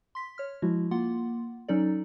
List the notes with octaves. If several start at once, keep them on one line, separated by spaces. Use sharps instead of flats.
C6 B6
C#5 F6
F3 G#3 E4 F#4
A#3 F4 F#5 C6
F#3 C#4 D#4 A4 D5